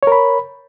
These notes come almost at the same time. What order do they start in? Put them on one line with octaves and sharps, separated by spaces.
C#5 A#4 B5